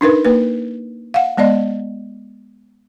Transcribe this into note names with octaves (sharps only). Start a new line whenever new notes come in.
D4 D#4 A#4 B4
A#3 B4
F5 F#5
G#3 B3 D5 D#5